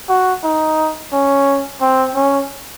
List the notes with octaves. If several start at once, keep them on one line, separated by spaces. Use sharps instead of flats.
F#4
D#4
C#4
C4
C#4